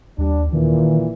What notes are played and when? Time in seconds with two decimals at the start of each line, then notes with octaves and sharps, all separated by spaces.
0.18 D#2 G3 D4
0.53 A#2 D#3 E3